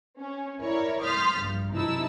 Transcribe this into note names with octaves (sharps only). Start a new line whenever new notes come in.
C#4
E4 A#4 C#5 D5
C6 D#6 F6 G6 A6 B6
A#1 G2
F#2 C3 D#4 E4 A5 E6